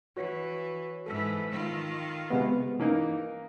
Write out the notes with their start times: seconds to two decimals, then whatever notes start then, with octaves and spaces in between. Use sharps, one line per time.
0.17 E3 F#4 B4 C#5
1.06 G#2 E3 A4 E6
1.51 D#3 F4
2.30 C3 G#3 B3
2.79 E3 A#3 D#4